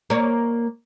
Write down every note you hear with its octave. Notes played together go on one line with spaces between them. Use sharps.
A#3 C#5